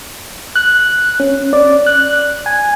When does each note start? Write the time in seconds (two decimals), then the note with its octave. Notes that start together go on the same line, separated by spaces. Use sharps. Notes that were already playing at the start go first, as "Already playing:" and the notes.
0.56 F#6
1.20 C#4
1.53 D5
1.86 F#6
2.46 G#5